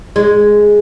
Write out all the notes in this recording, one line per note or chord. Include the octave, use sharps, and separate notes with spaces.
G#3